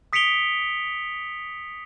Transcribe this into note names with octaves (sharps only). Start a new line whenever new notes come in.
D#6 B6 C#7 D7 F7 G7